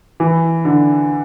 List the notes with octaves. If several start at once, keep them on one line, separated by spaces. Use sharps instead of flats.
E3
D3